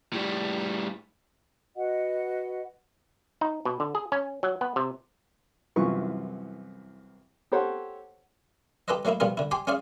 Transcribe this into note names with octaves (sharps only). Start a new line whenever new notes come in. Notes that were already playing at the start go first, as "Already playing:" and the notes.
A2 G3
F#4 B4 D#5 F#5
D#4
B2
D3
G#4
C#4
F#3
B3
C3
C2 F#2 E3 B3 F4 C#6
G4 A4 C5 C#5 F#5
D#4 G4 A4 B4 C5 D#5
F#3 A3 A#3 D#4 E4
B2 F3 G3 B3 F4 A#4
D3 E4
G4 G5 G#5 C6 D6
C#4 F4 G#4 D5 F5